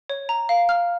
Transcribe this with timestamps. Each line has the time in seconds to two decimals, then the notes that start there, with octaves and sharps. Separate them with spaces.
0.10 C#5
0.29 A#5
0.49 F5
0.69 F6